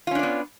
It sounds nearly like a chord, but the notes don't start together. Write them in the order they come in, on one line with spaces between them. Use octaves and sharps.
F4 C#4 D4 D5 B3